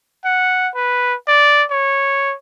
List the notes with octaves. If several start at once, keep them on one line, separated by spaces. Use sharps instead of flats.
F#5
B4
D5
C#5